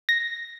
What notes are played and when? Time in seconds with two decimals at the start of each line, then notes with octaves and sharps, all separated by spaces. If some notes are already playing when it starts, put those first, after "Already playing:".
0.09 A#6